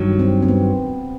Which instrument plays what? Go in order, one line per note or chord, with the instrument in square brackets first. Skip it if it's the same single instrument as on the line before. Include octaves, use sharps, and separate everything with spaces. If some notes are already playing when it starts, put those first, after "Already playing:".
Already playing: [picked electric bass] G2 D#3 F#3
[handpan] C4
C4
B3